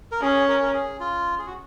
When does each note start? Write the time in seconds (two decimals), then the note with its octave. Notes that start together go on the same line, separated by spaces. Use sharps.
0.12 A#4
0.22 C#4 G#4
0.48 A#4
0.63 A#4
0.74 G#4
1.00 F4
1.39 G#4
1.46 F#4